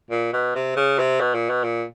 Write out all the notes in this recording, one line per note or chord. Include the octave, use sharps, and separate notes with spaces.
A#2
B2
C3
C#3
C3
B2
A#2
B2
A#2